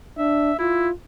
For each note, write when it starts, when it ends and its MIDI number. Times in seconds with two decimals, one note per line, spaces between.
0.18 0.52 62
0.18 0.56 76
0.59 0.88 64
0.59 0.91 65